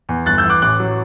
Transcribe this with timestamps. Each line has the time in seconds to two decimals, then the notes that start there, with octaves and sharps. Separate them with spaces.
0.09 E2
0.26 G1 F#6 A6
0.38 E6 G6
0.44 E3
0.50 D6 F#6
0.62 A1 D6 F#6
0.80 F#3